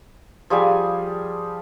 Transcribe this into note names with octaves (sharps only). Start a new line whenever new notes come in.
F3 G3 G#4 G#5